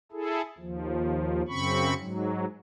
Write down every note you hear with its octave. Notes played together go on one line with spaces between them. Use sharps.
E4 G#4 A4
D#2 F3
F#2 C#3 C4 B5 C#6
G#2 F#3